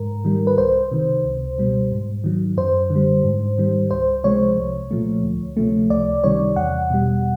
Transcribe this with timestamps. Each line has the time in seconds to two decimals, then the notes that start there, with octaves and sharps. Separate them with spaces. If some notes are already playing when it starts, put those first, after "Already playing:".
Already playing: G#2 A#4
0.24 D#3 G3
0.47 B4
0.58 C2 C5
0.92 C3 D#3
1.24 C#2
1.58 B2 G3
1.92 G#2
2.24 D#3 F#3
2.57 F#2 C5
2.90 D3
2.95 G3
3.24 G#2
3.58 D#3 G3
3.91 C#2 C5
4.24 C3 F3 G#3 C#5
4.57 C2
4.91 A#2 F3 A3
5.23 D2
5.57 C3 F3 A3
5.90 C#2 D5
6.24 C3 D#3 G3 C#5
6.56 E2 F#5
6.90 B2 G3